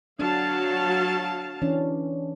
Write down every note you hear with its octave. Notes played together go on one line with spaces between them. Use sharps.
F#3 D4 F5 A5
E3 C#4 D4